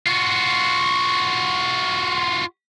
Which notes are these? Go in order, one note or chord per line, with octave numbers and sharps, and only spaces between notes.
F4 F#4